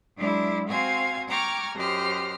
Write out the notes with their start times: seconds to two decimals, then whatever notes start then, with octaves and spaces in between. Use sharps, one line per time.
0.17 F#3 G#3 D4 E4
0.68 C4 F#4 C5 F5 G#5 G#6
1.29 G5 A#5 C#6 D6 F6 G#6
1.75 F#2 G4 C5 D#5 F6